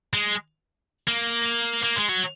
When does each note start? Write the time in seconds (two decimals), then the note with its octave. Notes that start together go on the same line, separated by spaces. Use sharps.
0.14 G#3
1.07 A#3
1.84 A#3
1.96 G#3
2.09 F#3